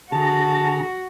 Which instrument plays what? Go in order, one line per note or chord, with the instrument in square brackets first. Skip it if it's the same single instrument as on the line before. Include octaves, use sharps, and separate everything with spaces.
[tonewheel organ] D3 G#4 A#5 [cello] F#4 [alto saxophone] A5